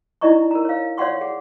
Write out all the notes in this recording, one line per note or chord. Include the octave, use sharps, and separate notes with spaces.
D#4 E4 D5 D#5 A#5 C#6
A#4 A#5
C#5 F5
C#5 D5 F5 F#5 C6 C#6
G#4 F#5